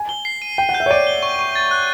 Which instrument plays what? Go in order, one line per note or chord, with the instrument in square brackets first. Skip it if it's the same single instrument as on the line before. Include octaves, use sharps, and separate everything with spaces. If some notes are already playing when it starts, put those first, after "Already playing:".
Already playing: [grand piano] G#5
[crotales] G7
C7
D#7
[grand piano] G5 [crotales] D#7
[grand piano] F#5
[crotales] G6
[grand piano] E5
C#5
[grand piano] D5 [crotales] D#7
[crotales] G7
C#6
C#6
A6
F#6